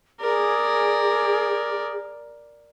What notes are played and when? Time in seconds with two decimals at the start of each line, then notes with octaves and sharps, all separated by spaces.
0.20 G#4 A#4 D5